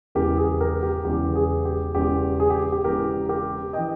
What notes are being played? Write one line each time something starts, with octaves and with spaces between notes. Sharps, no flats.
E1 E2 C#3 E3 G4 A#4
G#4
G4 A#4
G4
E1 E2 C#3 E3 G4
G#4
G4
E1 E2 C#3 E3 G4
G#4
G4
G4
E1 E2 C#3 E3 G4 A#4
G4 A#4
E3 D#5 G5